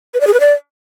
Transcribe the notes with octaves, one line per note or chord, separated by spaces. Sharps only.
B4
D5
G#4
B4
D5